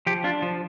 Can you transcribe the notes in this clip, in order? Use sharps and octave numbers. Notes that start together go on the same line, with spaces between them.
F3 G4
D4 F4
F3